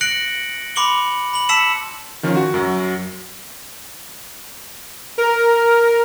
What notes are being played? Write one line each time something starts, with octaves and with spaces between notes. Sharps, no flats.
F#6 A#6 C#7 D7 F#7
B5 C6 D6 C#7 F#7 G7
B5 F#7
A5 E6 B6 C#7 E7 F#7
D#3 F3 C#4
F#4
F#2 F#3
A#4